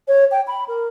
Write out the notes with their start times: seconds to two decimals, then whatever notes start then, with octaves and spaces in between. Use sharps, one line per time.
0.08 C#5
0.31 G5
0.47 B5
0.68 A#4